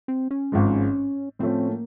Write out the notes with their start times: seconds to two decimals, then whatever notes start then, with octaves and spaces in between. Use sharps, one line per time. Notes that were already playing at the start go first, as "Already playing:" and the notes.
0.08 C4
0.31 C#4
0.52 G#1 G#2 F3 G#3
1.39 A2 F3 A3 C4 C#4
1.69 A#3